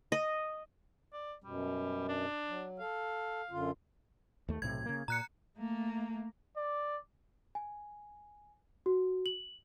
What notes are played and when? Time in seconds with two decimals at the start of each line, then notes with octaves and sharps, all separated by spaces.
0.12 D#5
1.13 D5
1.44 F#2 B2 G3
2.09 D4
2.47 F#3
2.80 A4 F5
3.51 F#2 D3 F4
4.48 D#2 A3
4.62 B1 A2 C3 G#6
4.86 C#3 A#3
5.08 A#2 A#5 F#6 C#7
5.58 A3 A#3
6.57 D5
7.55 G#5
8.86 F#4
9.26 F#7